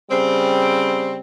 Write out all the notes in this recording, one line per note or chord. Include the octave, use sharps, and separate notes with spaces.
C#3 G3 C4